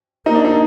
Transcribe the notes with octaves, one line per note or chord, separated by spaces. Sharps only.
A#3 D#4
D4
D#4